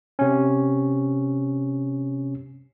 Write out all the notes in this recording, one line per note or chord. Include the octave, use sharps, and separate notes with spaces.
C3 C#4